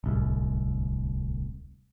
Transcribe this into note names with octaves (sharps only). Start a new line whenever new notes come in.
D1 C2